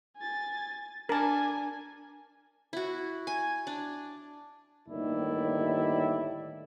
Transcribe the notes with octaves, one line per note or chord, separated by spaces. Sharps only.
G#5 A6
D4 A#4 G#5 A5
E4 F#4
G#5
D4
G1 D#2 A2 D#3 E4 D5